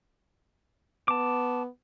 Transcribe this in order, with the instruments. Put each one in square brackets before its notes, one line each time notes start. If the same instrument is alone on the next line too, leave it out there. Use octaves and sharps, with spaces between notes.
[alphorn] B3 [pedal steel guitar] A5 D6